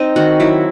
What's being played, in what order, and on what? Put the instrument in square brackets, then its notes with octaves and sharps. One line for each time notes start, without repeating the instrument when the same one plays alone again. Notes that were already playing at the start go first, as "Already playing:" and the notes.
Already playing: [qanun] C4 D#4 D#5
D#3 F#4 F#5
F#3 E4 E5